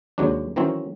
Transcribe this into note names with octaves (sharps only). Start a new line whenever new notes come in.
D#2 C3 F#3 G#3 D4
D#3 E3 F#3 C4 C#4